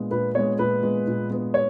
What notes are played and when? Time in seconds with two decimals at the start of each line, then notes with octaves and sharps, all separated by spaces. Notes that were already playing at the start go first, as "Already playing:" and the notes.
Already playing: A#2 G#3 B3
0.11 A#2 B4
0.35 G#3 B3 C#5
0.58 A#2 B4
0.83 G#3 B3
1.07 A#2
1.30 G#3 B3
1.54 C#5